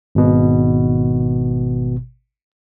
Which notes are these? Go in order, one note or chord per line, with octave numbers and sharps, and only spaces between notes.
G#1 B2